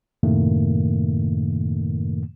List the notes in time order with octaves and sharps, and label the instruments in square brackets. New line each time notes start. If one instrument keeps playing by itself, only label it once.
[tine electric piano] F#2 A2 C3 D#3 A3 A#3